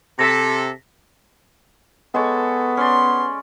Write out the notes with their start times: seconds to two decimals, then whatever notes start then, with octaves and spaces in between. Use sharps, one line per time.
0.19 C3 A4 A#6 B6
2.14 G#3 B3 A4 C#5
2.77 C#4 D5 C6